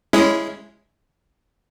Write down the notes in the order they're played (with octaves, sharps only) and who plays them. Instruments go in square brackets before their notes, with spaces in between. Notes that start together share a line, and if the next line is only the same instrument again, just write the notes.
[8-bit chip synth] G#3 C#4 E4